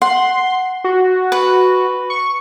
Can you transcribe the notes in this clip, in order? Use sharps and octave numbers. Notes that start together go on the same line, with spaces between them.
F#5 C6
F#4
B4
C#6